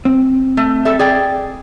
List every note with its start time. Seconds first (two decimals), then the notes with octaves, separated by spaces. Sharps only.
0.05 C4
0.57 A3
0.85 G3 A4 E5
0.99 G#4 D5 G5